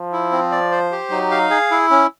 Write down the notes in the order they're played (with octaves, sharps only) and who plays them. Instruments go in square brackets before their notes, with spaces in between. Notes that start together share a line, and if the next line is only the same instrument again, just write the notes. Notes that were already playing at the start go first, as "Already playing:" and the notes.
Already playing: [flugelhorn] F3
[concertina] E4
C4
D5
C5
G4
[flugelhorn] F#3 [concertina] D#4
[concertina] F5
G#4
E4
C#4